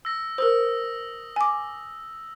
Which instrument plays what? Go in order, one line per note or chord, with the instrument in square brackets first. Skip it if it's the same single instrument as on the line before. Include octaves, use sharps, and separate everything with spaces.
[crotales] E6 A#6
[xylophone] A#4 C5 [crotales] D#6 E6
[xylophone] G#5 D6